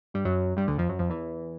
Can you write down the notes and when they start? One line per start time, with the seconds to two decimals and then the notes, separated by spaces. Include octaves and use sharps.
0.14 G2 G3
0.25 F#2 F#3
0.56 G2 G3
0.68 D2 D3
0.78 F2 F3
0.89 F#2 F#3
0.99 F2 F3
1.10 E2 E3